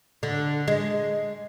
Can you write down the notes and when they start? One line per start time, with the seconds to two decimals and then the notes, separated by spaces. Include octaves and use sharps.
0.23 D3
0.68 G#3